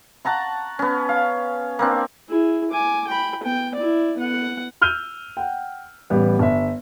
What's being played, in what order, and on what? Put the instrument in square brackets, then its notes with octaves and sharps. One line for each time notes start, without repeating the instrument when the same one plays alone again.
[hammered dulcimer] F#5 A5 A#5 C#6
B3 C#4
F5
A#3 C4 D4
[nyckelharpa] E4 G#4
G#5 D6
G5 B5
B3 G5
E4 D5
B3 F#5
[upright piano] E6 F6 G6 D#7 G7
F#5 G5
A1 G3 B3
G1 E5